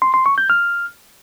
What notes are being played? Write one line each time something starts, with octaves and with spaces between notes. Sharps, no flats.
C6
C6
C#6
G6
F6